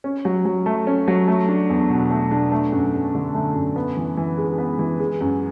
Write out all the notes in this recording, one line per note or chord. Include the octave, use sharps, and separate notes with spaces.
C#4
F#3
F#3
A3
C#4
F#3
A3
D4
E2
B2
A3
D4
A3
F#2
F#2
D3
A3
F#2
B3
E3
E3
G#3
B3
E3
G#3
F#2